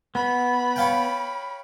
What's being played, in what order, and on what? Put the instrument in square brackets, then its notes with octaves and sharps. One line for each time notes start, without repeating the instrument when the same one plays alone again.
[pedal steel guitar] B3 [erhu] B5
[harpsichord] C#5 F5 G5